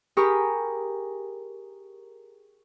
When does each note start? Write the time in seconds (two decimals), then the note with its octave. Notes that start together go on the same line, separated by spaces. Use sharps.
0.17 G4 G#4 A#4 B5 C#6 D#6